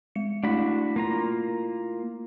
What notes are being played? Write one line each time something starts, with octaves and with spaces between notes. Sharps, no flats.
G#3 C#7
A3 D4 E4 F#4 B5
A#3 F4 A#5